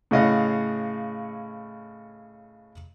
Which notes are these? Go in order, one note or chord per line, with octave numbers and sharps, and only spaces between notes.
A2 C#3 C#5 D#5 F5 F#5